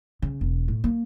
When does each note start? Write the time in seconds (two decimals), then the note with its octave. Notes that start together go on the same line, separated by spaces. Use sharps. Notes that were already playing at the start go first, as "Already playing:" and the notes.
0.22 C#3
0.41 E1
0.68 A2
0.84 A#3